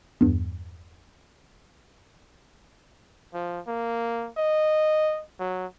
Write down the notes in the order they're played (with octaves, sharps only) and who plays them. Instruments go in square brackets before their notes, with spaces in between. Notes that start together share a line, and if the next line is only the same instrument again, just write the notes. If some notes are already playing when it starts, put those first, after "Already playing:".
[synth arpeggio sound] E2 G2
[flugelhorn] F3
A#3
D#5
F#3